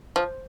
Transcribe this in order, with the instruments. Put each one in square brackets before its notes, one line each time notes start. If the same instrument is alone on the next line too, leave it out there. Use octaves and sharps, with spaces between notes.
[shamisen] F3